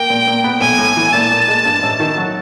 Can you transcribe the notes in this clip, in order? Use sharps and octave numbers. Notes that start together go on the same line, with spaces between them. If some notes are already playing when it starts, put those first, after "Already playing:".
Already playing: A#3 G5
A#2
A#2
B3
B1 G#5
A2
E3
A#2 A5
A#2
G#3
G2
A1
D#3
F#3